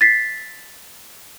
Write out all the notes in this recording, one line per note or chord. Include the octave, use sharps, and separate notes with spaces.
A6 B6 C7